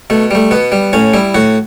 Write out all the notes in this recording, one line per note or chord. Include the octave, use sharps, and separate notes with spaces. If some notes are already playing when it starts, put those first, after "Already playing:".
B2 A3
G3 A3
B2 B3
G3
A2 C#4
G3 E4
A2 F#4